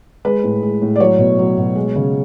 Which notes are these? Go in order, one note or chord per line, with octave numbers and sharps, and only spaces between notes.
G#3 B4
A2
G#3
A2
D5
F#3 C#5
B2
F#3
B2
G#3
C#3